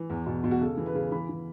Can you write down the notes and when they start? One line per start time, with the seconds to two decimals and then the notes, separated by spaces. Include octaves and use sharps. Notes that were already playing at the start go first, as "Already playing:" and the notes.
Already playing: E3
0.10 E2
0.26 B2
0.44 B2
0.51 F#4
0.61 C#3 A4
0.77 E3
0.86 B4
0.95 C#3
1.12 E3 B5
1.29 E3